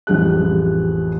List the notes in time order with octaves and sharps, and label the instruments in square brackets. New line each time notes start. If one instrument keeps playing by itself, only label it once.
[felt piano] A1 F2 G4 G#4 F#6